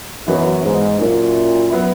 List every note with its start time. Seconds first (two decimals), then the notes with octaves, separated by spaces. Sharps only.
0.27 F#2 E3 B3 D#4
0.64 G#2
0.99 F#2 A#2
1.70 F#3 B3 E4